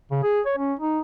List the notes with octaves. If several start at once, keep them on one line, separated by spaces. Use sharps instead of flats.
C#3
G#4
C#5
C#4
D#4